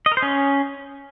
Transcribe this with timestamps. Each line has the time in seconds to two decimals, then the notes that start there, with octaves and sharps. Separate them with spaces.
0.06 D#5
0.12 A#4
0.17 C5
0.22 C#4